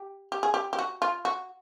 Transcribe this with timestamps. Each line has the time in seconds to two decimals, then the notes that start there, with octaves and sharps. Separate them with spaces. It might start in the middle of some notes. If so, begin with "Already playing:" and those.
Already playing: G4
0.32 G4
0.43 G#4
0.54 G4
0.73 G4
0.79 F#4
1.02 F4
1.25 F#4